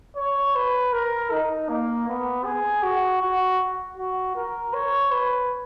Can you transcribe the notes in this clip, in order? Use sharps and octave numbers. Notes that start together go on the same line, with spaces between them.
C#5
B4
A#4
D#4
A#3
B3
G#4
F#4
F#4
F#4
A#4
C#5
B4